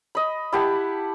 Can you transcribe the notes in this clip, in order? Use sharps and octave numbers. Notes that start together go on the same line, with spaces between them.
D#5 B5
E4 G4 F#5 A5